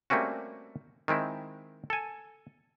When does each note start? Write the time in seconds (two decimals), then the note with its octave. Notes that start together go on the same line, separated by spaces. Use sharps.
0.10 G3 A3 A#3 C4 C#4 F#4
1.08 D#3 G#3 C4 E4
1.90 A4 G#5